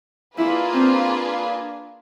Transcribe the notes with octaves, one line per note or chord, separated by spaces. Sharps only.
A#3 D4 E4 F4 G#4 B4
C4